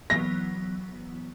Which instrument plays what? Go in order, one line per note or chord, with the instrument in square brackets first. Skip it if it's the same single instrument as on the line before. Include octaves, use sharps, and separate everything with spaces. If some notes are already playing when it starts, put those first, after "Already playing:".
[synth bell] E3 F#3 B3 [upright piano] A#6